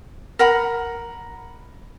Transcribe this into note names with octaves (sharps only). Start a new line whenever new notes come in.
A#4 F#5 B5